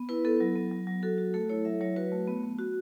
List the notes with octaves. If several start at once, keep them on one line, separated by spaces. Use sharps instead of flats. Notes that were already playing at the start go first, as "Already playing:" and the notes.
Already playing: B3
E4 B4
B3 A4
F#3
B3
F#3
F#3
F#4 A4
F#4
A3 A4
E4 C#5
F#3 E5
F#3 C#5
F#4 B4
A3
B3
B3
F#4